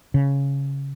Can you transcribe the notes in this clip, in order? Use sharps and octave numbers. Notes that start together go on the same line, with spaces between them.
C#3